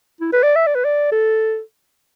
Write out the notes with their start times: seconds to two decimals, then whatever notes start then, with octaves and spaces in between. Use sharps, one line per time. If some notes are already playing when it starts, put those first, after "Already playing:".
0.21 E4
0.33 B4
0.43 D5
0.56 E5
0.67 D5
0.75 B4
0.85 D5
1.12 A4